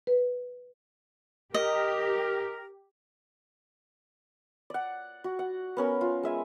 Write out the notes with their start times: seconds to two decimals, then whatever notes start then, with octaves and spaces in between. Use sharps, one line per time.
0.07 B4
1.54 G4 A#4 D#5
4.70 D5 F#5
5.24 F#4
5.39 F#5
5.77 B3 C#4 A#4
6.01 F4
6.23 G#3 E5 G#5